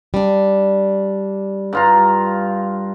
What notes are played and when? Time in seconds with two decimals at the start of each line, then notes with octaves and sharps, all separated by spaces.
0.14 G3 D4
1.73 G2 F4 A#5